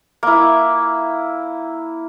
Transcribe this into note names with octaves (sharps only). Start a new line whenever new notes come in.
A#3 E4